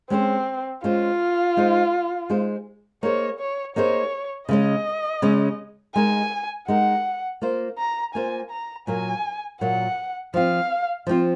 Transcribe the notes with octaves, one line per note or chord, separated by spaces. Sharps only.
G#3 C4 C#4 G#4 C5
G#3 C#4 F4 G#4 C5
G#3 D#4 G#4 C5
G#3 D#4 G#4 C5
A#3 D#4 G#4 C5 C#5
C#5
A#3 D#4 G#4 C5 C#5
C#3 G#3 C#4 D#5
C#3 G#3 C#4
G#3 D#4 A#4 G#5
G#3 D#4 A#4 F#5
A#3 F4 C5
A#5
A#3 F4 C5 G#5
A#5
A#2 F#3 A#3 G#5
A#2 F#3 A#3 F#5
F3 C4 F4 F5
F3 C4 F4